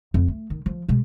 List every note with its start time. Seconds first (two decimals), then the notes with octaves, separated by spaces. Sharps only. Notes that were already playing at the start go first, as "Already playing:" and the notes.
0.14 F2
0.28 A3
0.50 D#3
0.66 F3
0.88 B2 G#3